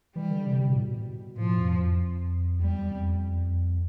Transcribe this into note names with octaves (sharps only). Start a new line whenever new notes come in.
E3 G3
D3
C3
C3
B2
A2
B2
A2 F3
F2
F2
E2 G3
F2